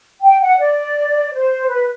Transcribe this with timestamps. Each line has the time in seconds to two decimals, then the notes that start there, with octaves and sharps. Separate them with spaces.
0.22 G5
0.40 F#5
0.59 D5
1.32 C5
1.68 B4